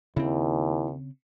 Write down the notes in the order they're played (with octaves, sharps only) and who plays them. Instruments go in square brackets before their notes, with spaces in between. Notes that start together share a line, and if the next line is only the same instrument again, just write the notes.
[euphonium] D#2 [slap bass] C#3 C4 [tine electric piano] E4